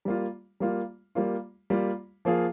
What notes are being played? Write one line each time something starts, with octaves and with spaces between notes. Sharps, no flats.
G3 A#3 F4
G3 A#3 F4
G3 A#3 F4
G3 A#3 F4
F3 A#3 F4 G#4